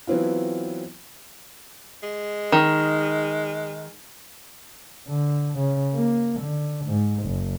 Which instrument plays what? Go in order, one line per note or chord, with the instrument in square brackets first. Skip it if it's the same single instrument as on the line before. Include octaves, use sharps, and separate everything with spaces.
[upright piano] E3 F#3 B3 C4 E4 F4
[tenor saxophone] G#3
[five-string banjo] D#3
[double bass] D3
C#3
A#3
D3
G#2
F#1